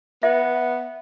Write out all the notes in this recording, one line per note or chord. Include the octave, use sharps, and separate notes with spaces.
B3 E5